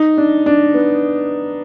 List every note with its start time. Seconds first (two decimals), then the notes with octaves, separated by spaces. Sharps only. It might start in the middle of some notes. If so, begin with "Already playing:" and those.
Already playing: D#4
0.18 D4
0.46 D4
0.74 B3